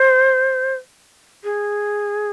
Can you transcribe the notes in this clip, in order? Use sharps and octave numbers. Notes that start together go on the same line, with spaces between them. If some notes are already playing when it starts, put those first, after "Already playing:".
Already playing: C5
G#4